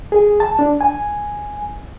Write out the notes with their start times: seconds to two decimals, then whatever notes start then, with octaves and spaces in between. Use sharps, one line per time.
0.12 G#4
0.40 A5
0.59 D4
0.81 G#5